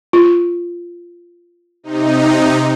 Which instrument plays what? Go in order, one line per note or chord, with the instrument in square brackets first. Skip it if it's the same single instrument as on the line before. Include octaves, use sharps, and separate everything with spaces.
[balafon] F4
[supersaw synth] C3 D#4